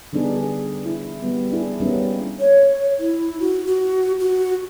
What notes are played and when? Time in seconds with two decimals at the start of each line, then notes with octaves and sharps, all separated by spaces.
0.13 D3 G3 B3 D4 D#4 G#4
0.36 G#4
0.85 E4
1.22 G3 B3
1.52 D4 E4 G#4
1.80 G3 A#3 B3 C#4 D#4
2.40 C#5
3.00 E4
3.40 F#4
3.67 F#4
4.20 F#4